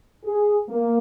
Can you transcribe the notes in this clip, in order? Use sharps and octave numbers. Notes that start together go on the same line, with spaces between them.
G#4
A#3